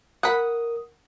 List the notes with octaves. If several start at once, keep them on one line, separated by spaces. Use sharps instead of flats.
A#4 F#5 B5 D#6